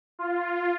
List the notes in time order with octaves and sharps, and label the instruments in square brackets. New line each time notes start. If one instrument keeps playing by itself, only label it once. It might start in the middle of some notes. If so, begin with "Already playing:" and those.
[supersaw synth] F4